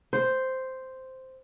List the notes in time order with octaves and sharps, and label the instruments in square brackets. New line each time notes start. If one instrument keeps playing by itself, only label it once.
[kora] C5